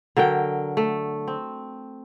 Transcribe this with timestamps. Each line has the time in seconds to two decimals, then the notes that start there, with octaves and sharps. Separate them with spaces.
0.17 D3 F#3 A#4 G5
0.77 A3
1.28 C4